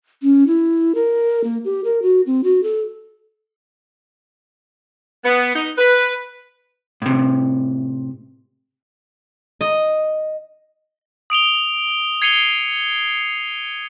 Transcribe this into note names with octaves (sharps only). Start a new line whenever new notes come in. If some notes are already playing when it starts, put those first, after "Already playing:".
C#4
E4
A#4
A#3
G4
A#4
F#4
C4
F#4
A4
B3
D#4
B4
A2 C3
D#5
D#6 D7 F7 G7
G#6 C7 C#7 D#7 F7 G7